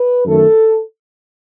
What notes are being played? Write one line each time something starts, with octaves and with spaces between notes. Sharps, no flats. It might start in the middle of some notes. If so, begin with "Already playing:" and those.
Already playing: B4
F#2 D#3 A3 A4